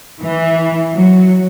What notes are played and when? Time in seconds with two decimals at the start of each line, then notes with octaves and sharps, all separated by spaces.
0.23 E3
0.94 F#3